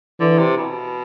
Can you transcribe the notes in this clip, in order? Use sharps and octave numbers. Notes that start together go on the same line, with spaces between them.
D3 E3
C3
B2